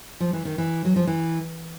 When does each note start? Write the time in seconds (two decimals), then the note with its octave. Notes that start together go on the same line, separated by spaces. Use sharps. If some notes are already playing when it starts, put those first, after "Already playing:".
0.20 F3
0.33 E3
0.45 D#3
0.58 E3
0.85 F#3
0.96 F3
1.07 E3